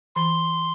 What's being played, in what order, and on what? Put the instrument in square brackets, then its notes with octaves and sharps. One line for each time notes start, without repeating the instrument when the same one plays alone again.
[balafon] E3 [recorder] C6